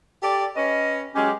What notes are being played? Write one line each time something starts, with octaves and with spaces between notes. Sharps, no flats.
G4 A4 D5
C#4 B4 D#5
F#3 G#3 C#4 G4